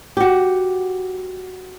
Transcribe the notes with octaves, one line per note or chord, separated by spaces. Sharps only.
F#4 G4